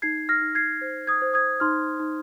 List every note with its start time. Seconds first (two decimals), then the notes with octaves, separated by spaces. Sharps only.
0.02 D#4 G#6 C7
0.29 F6 A#6
0.42 D#4
0.55 G#6 C7
0.81 C5
1.07 D#6 G#6
1.22 C5
1.34 D#6 G#6
1.60 D#4 C6 F6
2.00 D#4